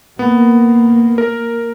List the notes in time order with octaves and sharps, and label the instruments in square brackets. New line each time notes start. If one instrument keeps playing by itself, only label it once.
[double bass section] A#3 [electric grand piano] B3
[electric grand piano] A#4